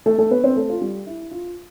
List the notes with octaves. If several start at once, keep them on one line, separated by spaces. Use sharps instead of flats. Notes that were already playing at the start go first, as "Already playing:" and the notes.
A3 A4
A3 A4
B3 B4
C4 C5
A3 A4
F4
G3 G4
E4
F4